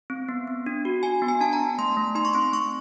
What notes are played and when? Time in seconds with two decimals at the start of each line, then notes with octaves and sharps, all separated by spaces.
0.10 C4
0.29 B3
0.47 B3
0.66 D4
0.85 F#4
1.03 F#4 G#5
1.22 B3
1.28 G#5
1.41 D4 A5
1.53 A#5
1.59 B3
1.78 A3 C6
1.97 A3
2.15 D#4 C6
2.25 C#6
2.33 C4 C6
2.53 A3 C#6